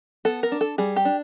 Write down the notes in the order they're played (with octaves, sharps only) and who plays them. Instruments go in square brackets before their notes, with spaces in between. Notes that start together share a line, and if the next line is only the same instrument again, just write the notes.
[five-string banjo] B3 A4
A#4
D4
A4
G3 G#4
G4
D4